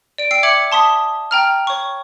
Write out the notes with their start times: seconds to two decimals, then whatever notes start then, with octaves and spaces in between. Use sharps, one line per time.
0.18 D5 D7
0.31 G5 E6 C7 D7
0.43 E5 D6 G#6 C#7 F#7
0.72 A5 C6 D#6 B6
1.31 G5 A#5 F6
1.67 C#5 C#6